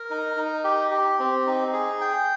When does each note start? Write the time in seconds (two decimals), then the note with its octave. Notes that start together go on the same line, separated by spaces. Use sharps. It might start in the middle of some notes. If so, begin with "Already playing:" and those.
Already playing: A#4
0.10 D#4
0.37 D#4
0.64 G4
0.91 G4
1.19 C4
1.46 D#4
1.73 G#4
2.01 G5